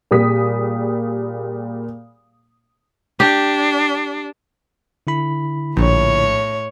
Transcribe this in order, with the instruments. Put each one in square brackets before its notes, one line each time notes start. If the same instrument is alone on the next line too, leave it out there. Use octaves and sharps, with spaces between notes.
[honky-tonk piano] A#2 G3 G#4 D#6 B6
[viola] D4 [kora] G4
[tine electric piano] D3 E4 B5
[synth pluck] A#1 [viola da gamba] A2 C#5